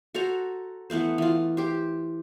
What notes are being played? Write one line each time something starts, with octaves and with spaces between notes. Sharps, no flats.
F#4 A4 C5 A#5
E3 A3 B3 C5
E3 F4
G4 C5